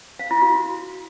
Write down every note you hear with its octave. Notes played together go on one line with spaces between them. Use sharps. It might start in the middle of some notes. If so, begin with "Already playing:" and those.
F5
E4
F#4